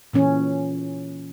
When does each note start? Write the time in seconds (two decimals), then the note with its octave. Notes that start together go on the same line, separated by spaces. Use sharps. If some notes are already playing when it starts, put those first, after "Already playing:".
0.13 A#2 E3 C#4